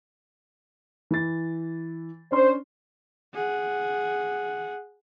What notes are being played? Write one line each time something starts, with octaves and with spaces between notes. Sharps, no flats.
E3 A6
C#4 D4 C5 C6
G#4 F#5